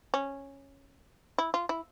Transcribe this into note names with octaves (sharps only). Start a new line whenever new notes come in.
C#4
E4
F4
E4